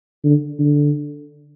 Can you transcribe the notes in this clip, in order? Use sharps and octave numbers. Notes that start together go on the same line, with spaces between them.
D3
D3